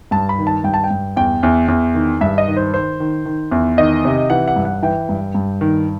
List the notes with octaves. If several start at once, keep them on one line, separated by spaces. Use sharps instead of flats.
G2 A5
B5
D#3
A5
G2 G5
A5
G5
G2
E2 G5
E2
E2
D#3
G2 E5
D#5
D#3
C5
D#3 C5
D#3
D#3
E2
D#3 D#5
C3
E3 F#5
F#5
G2
F#5
E3 G5
G2
G2
D#3